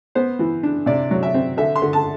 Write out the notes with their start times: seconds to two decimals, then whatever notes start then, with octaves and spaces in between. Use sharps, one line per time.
0.15 B3 C5
0.39 E3
0.63 D4
0.86 C3 D5
1.11 F#3
1.23 E5
1.34 C4
1.57 D3 E5
1.76 C6
1.82 D3
1.93 A5